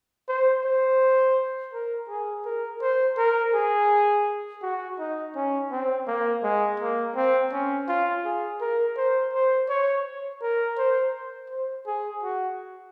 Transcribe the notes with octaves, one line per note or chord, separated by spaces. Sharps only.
C5
C5
A#4
G#4
A#4
C5
A#4
G#4
F#4
D#4
C#4
C4
A#3
G#3
A#3
C4
C#4
F4
G#4
A#4
C5
C5
C#5
A#4
C5
C5
G#4
F#4